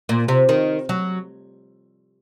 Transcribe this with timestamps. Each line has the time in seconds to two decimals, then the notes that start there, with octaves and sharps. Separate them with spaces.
0.09 A#2
0.28 C3
0.49 D#3
0.89 F#3